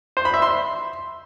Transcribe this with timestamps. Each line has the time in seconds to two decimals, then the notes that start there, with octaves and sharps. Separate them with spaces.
0.17 C5
0.25 B5
0.34 E5
0.42 C6